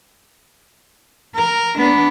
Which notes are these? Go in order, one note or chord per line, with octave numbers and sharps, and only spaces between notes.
A#4
B3 D4